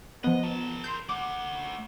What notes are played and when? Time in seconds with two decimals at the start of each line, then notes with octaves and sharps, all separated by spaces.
0.24 F3 B3 D#5
0.43 A#4 A5
0.84 C6 G6
1.09 A3 F#5 D6